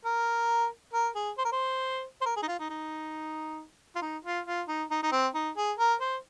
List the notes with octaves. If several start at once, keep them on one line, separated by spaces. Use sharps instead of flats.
A#4
A#4
G#4
C5
A#4
C5
C5
A#4
G#4
D#4
F4
D#4
D#4
F4
D#4
F4
F4
D#4
D#4
D#4
C4
D#4
G#4
A#4
C5